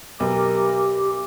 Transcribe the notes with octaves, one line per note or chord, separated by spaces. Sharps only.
B1 G4 A#4